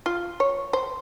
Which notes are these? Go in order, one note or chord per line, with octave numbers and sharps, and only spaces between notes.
F4
C#5
C5